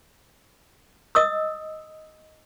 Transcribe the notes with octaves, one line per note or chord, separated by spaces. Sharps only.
D#5 D#6 E6